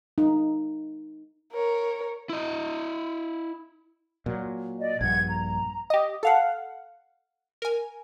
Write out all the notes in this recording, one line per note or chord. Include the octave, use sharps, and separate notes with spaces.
D#4
A#4 C#5
E4 D#5
A#2 F#3
D5 D#5
A#1 G2 F#5 G#6
A#5
G4 D#5
A4 F5 F#5
A#4 G#5